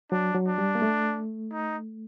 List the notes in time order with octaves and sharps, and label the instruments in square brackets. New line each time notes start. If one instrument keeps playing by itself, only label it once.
[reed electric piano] F#3 [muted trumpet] D4
[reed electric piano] F#3
[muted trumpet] D4
[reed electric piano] G3
A#3
A3
[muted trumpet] D#4